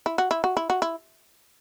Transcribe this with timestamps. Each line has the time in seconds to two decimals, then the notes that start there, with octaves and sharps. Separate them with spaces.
0.06 E4
0.18 F#4
0.31 E4
0.44 F#4
0.57 E4
0.70 F#4
0.82 E4